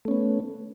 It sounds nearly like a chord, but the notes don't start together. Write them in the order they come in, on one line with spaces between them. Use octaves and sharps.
A3 C#4 B3